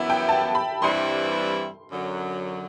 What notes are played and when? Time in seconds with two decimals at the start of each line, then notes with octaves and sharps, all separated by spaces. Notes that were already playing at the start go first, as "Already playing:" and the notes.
Already playing: F#2 E3 B3 E4 E5
0.10 G5
0.29 A5
0.55 B5
0.82 G2 E3 G3 C4 E4 C6
1.91 F#2 D3 F#3